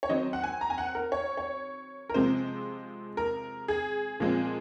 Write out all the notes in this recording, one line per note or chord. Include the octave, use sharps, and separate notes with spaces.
C#5
D#3 F#3 C4 D#5
F#5
G#5
A#5
G#5
F#5
A#4
C#5
C#5
A#4
C3 F3 G#3 C4 C5
A#4
G#4
A#2 F3 G#3 C4